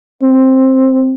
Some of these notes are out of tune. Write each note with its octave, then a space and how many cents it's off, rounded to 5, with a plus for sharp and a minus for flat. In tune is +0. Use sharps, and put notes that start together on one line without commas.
C4 +10